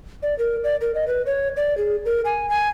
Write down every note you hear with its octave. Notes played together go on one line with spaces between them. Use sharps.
D5
A#4
D5
A#4
D#5
B4
C#5
D5
G#4
A#4
G#5
G#5